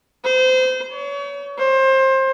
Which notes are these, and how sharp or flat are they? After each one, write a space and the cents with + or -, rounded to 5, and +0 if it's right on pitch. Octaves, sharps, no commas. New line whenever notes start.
C5 -25
C#5 +35
C5 +25